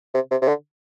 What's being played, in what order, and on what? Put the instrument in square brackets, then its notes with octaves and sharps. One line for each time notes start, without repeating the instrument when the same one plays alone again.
[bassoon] C3
C3
C3
D3